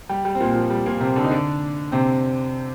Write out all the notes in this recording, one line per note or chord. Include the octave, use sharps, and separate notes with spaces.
G3 G4
G3 G4
C4
A#2 A#3
F3
G3
A#2 A#3
C3 C4
D3 D4
D#4
D3 D4
C3 C4